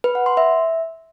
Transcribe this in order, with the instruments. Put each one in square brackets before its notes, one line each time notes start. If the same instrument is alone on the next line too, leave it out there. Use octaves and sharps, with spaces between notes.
[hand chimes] B4
F#5
C6
E5